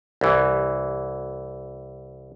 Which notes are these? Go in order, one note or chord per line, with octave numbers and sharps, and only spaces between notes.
C2 E3